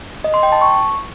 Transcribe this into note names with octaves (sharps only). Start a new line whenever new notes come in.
D#5
C6
G5
A5
C#6